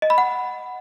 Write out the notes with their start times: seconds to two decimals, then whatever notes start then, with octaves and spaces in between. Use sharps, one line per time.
0.02 D#5
0.10 B5
0.18 F#5